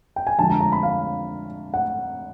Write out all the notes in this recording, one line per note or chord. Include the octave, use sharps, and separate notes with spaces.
G5
G#5
F2 D3 F3 G#3 A5
A#5
A#5
B5
F5
F#5